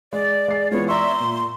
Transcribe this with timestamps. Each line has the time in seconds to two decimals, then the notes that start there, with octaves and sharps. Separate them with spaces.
0.13 G#3 D5
0.48 G#3 C7
0.71 E3 G#3 B3 F4 C#5
0.88 D5 E5 A#5 C6 C#6
1.20 A#2